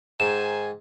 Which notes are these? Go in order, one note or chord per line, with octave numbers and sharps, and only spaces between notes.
G#2 D#3 C5 G#5 E7